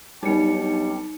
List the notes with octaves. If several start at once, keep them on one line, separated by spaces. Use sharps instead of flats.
B1 G3 C4 D4 D#4 G4 C#7